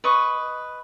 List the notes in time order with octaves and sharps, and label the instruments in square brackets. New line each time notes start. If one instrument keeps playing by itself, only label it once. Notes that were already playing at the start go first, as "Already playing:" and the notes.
[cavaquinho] B4 D#5 C#6